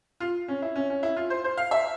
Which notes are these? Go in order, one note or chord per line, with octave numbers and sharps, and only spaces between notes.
F4
C#4
E4
C#4
C#4
E4
F4
C5
C5
F5
E5